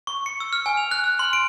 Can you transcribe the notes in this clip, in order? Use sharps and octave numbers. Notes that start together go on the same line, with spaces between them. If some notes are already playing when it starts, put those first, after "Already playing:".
C#6
C#7
E6
F6
G#5
F7
F#6
F6
C6
D7